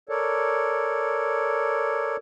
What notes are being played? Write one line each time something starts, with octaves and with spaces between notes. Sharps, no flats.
A4 A#4 C#5 D5